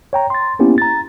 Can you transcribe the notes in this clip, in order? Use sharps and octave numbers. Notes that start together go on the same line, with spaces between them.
C#5 G5 A#5
C6 A6
A#3 B3 C#4 E4 G4
A#5 A6